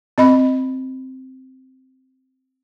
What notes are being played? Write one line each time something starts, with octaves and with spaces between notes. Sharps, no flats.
C4 D#5 B5